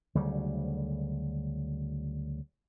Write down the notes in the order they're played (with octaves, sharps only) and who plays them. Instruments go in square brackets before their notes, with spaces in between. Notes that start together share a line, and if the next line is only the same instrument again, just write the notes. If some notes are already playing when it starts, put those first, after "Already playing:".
[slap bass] D2 C#3 F#3 G3